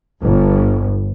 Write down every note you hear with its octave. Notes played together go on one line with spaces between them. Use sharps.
G1